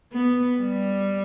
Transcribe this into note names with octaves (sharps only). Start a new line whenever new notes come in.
B3
G3